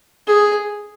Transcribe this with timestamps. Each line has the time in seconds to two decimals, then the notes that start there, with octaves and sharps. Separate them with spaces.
0.27 G#4